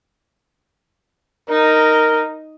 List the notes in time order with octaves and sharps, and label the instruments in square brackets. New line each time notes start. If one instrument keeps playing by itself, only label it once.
[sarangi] D#4 [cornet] A#4